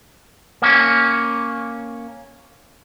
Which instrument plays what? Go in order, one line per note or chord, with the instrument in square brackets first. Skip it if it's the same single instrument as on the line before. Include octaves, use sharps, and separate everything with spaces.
[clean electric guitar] A#3 C#4